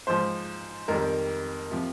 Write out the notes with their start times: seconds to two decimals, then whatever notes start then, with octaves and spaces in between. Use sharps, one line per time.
0.07 G#2 F3 C5
0.88 F2 D#3 G3 A#4
1.71 C3 F3